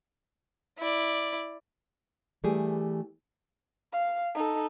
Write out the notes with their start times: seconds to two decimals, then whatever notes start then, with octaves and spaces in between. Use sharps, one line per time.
0.78 E4 D5
2.44 E3 G3 A3 G4 G#4
3.93 F5
4.34 D#4 A4